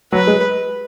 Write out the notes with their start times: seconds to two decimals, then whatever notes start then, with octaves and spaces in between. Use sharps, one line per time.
0.12 F#3 B4
0.27 G#3